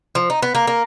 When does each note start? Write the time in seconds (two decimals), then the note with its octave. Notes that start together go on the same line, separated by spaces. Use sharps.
0.15 F3
0.30 D#4
0.42 B3
0.55 A#3
0.67 A#3